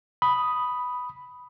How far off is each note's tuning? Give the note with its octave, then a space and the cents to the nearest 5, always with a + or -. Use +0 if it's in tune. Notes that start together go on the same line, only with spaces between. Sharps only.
B5 +0 D#6 +0